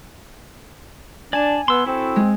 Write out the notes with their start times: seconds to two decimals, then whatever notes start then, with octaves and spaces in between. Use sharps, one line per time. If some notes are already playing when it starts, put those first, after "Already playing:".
1.33 D4 D5 G#5 A5
1.68 B3 C6 E6
1.86 C4 E4 F#4 A4
2.16 G#3